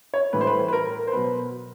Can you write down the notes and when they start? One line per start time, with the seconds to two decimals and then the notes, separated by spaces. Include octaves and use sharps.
0.14 C#5
0.33 A2 E3 G3 B4
0.41 C5
0.47 B4
0.68 B4
0.73 A#4
1.07 C5
1.12 B2 F#3 B4